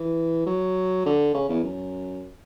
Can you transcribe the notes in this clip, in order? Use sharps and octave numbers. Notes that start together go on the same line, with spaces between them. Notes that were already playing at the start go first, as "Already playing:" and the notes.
Already playing: E3
F#3
D3
C#3
E2
F#2